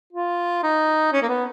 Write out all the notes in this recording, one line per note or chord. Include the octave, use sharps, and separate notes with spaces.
F4
D#4
C#4
A#3
B3